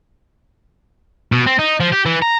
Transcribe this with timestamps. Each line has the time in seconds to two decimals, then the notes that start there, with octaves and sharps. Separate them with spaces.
1.32 B2
1.47 C4
1.59 D#4
1.80 F3
1.92 G4
2.06 E3
2.22 A#5